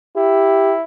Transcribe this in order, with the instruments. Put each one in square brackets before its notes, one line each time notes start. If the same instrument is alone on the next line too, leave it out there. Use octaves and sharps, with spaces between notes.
[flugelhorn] E4 [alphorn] G4